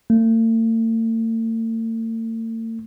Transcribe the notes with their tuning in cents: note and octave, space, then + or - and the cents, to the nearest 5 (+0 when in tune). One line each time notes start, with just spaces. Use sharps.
A3 +45